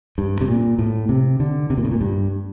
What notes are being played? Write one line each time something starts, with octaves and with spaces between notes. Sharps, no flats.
G2
C3
A#2
A2
C3
D3
C3
A#2
A2
A#2
G2